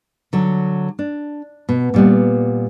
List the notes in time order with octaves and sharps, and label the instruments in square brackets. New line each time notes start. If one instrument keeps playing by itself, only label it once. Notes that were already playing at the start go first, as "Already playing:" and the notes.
[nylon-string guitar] D3 F#3
D4
B2
A#2 G3 B3